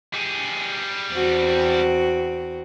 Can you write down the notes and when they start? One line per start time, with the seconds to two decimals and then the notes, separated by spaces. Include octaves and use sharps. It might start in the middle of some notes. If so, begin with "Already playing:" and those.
0.14 G3 G#4
1.12 E2 C4 F#4